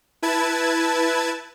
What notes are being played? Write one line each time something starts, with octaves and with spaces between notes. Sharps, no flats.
E4 B4 A5 G#6